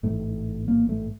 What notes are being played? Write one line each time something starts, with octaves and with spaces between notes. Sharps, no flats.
A1 G#2 A3
A#3
A3